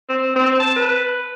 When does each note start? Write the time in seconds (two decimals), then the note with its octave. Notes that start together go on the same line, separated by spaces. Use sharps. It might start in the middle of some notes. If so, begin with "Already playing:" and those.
0.09 C4
0.36 C4
0.60 A5
0.76 B4